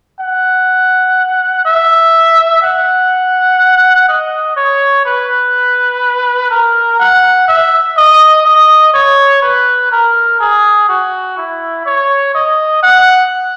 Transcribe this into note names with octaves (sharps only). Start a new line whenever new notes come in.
F#5
E5
F#5
D#5
C#5
B4
A#4
F#5
E5
D#5
D#5
C#5
B4
A#4
G#4
F#4
E4
C#5
D#5
F#5